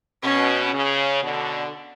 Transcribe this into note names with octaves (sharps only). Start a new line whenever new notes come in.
B2 C#4
C#3
B2 D3